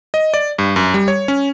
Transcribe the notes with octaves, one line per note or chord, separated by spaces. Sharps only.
D#5
D5
G2
F#2
G3
C#5
C#4